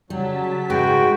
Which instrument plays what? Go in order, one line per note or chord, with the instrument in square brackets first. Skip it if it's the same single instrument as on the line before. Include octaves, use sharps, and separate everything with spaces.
[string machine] C#3 A5 B6 [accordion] F#3 [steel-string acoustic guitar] G3
[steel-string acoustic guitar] G#2 G#3 B4 [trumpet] F#4 [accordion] G5